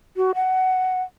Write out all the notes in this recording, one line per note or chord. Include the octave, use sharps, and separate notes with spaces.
F#4
F#5